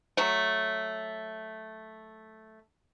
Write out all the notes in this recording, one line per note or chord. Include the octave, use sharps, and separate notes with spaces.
F#3 A3